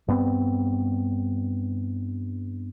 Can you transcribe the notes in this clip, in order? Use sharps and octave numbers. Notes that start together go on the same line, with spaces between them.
G2 B3 C4